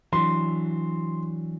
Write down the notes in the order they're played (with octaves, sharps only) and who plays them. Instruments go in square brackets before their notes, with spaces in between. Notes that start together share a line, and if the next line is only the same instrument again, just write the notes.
[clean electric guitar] E3 F#3 D4 [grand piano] C6